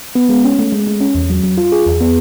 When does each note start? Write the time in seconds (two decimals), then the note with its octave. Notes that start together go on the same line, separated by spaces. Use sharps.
0.15 B3
0.29 G#3
0.44 C#4
0.59 A3
0.72 G#3
0.87 G#3
1.01 C#4
1.15 E2
1.30 F#3
1.44 F#3
1.57 F4
1.72 G#4
1.86 E2
2.01 B3